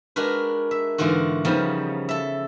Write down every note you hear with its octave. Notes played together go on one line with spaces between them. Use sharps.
G#3 D4 F#4 A#4 B4
E5
G#2 D3 E3 F4 F#4
C#3 F3 G3 B3 D#4
A4 E5